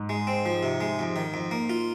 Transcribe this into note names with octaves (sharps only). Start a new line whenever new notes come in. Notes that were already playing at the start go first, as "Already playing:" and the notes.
Already playing: G#2
G#3
C4
F3
C3
G#3
F2
D#3
F2
A#3
F4